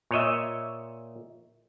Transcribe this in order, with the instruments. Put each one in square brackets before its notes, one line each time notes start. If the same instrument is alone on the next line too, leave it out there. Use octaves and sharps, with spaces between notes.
[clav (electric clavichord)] A#2 C#5 D#5 E5